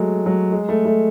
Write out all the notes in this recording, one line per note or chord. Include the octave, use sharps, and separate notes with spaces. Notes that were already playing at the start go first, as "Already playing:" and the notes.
Already playing: F#3 G#3 A3
F#3
G#3
A3
A3